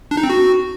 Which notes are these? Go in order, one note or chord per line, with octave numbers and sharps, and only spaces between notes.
D4
D#4
C4
F#4